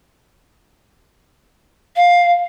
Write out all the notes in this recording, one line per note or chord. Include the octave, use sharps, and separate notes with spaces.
F5